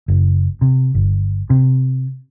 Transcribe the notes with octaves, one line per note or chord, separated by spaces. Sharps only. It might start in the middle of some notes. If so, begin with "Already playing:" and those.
F#1
C3
G1
C3